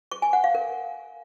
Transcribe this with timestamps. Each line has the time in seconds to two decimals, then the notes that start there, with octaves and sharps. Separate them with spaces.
0.11 D6
0.22 G#5
0.33 F#5
0.44 F5
0.55 A#4